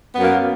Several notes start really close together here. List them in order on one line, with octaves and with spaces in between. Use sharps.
B3 F#2 A#3